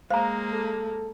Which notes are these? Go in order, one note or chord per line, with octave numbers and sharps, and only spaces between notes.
G#3 A#3 C5 F5 A#5
A4